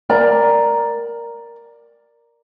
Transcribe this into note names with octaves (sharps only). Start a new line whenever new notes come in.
A#4 D5 A#5